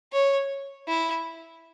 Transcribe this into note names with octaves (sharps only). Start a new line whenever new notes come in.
C#5
E4